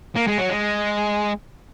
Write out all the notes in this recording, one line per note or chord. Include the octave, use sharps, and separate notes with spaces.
A#3
G#3
F#3
G#3